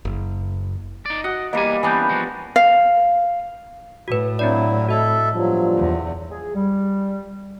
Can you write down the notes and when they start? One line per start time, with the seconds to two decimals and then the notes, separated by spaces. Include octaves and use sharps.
0.05 F#1
1.06 D#4 D5
1.24 F#4 D#5 F#5
1.53 E2 G3 A#3 D#5 G#5
1.83 E3 A#3 B3 C#4 D4 G#5 G6
2.09 F3 G#3 F#4
2.56 F5
4.08 A2 F#4 B4
4.39 F#3 C4 D4 E4 D5
4.88 F#4 A4 D#5 E5
5.34 G2 A#2 F3 F#3
5.77 E2
6.31 G#4
6.55 G3